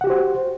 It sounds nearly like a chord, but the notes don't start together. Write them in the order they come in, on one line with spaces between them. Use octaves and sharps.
F#5 G4 F#4 C5